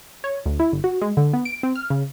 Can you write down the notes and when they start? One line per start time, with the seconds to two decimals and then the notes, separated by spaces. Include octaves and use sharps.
0.24 C#5
0.46 D2
0.60 E4
0.72 G1
0.84 F#4
1.02 G#3
1.17 D3
1.33 B3
1.45 D7
1.63 C4
1.75 F6
1.90 C#3